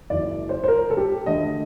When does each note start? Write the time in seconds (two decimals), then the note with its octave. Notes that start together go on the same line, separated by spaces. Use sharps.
0.10 F#1 F#2 D#3 D5
0.49 C5
0.64 C5
0.68 A#4
0.90 A4
0.97 G4
1.26 D2 D3 A3 D#5